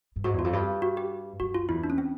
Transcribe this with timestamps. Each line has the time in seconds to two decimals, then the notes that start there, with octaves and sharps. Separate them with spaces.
0.16 G2
0.24 G#2 F#4
0.33 E2
0.39 F4
0.44 F2
0.53 G2
0.82 F#4
0.97 G4
1.40 F#2 F#4
1.54 F4
1.69 E2 E4
1.84 D4
1.90 C#4
1.98 C4